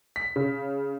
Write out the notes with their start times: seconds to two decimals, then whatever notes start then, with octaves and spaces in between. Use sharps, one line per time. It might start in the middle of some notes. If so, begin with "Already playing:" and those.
0.16 B6
0.36 C#3